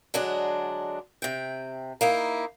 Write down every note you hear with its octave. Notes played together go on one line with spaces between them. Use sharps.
D3 F#3 G#3 D4
C3 G5
A#3 D#4 E4